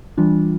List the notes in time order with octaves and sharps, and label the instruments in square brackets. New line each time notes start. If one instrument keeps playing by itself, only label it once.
[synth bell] E3 G3 D4 F4